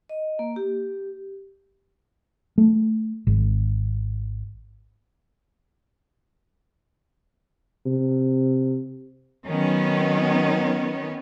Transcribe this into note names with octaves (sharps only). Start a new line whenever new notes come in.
D#5
A#3
G4
A3
G#1
C3
D#3 F#3 B3 C#4